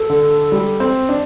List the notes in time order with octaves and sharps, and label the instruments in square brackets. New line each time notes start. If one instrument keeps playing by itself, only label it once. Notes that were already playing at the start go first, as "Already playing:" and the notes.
Already playing: [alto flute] A4
[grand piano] D3
G3
C4
D4